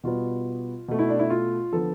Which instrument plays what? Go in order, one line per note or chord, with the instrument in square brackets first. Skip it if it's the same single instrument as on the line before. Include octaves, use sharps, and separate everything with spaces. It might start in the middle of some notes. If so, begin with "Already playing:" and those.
[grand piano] B2 G3 B3 F4
B2 A3
E4
D4
E4
F4
D3 F3 B3 A4